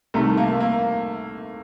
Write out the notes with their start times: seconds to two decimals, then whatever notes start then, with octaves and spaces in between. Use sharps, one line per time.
0.14 C2 C3 D#3 A3
0.37 A#3
0.60 A#3